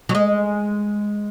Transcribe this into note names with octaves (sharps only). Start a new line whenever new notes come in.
F#3
G#3